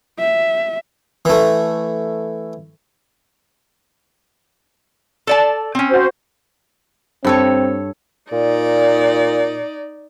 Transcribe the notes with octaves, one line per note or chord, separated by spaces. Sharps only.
E5
E3 A3
A4 D5 A5
C4 C#4
F#4 C5
G2 C4 A4 C#5
A#2 D#4 D5